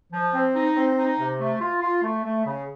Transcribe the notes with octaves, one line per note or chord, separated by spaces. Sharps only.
F3
C4
D#4
C4
D#4
C3
A3
F4
F4
A3
A3
C#3